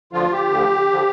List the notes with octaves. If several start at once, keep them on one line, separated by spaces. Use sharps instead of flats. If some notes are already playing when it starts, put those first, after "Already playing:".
D2 D3 F3 F4
G4
D2 D3 F3
D3 F3